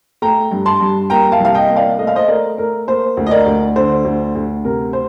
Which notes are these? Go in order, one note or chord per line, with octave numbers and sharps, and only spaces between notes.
A3 G5 A#5
G2
A5 C6
G2
A#3 G5 A#5
F5 A5
C2
F5
D#5 G5
A#3
D5 F5
A3 D#5
F5
C5 D#5
A3 A#4 D5
A3 A#4
A#3 C5
D2
D#5
A#4 D5
D2
D3 C5
D2
D2
C3 A#4
C5